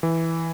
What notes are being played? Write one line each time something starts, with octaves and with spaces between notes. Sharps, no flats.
E3